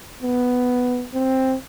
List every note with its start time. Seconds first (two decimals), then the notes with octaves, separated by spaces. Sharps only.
0.23 B3
1.14 C4